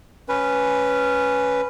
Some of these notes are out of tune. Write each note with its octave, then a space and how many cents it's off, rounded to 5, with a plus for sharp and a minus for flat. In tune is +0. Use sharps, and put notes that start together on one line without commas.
C#4 +0 B4 +0